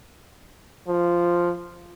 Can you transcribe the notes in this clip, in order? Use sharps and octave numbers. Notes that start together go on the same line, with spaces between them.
F3